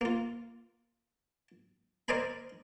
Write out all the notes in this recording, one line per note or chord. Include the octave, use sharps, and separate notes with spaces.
A#3 F4
A#4 C5 D5 D#5 G#5 B5